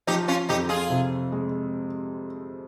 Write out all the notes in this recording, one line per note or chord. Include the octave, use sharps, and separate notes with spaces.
F3 D#4 G4
C#4 F4
F2 D#4 G4
F4 G#4
C3
G#3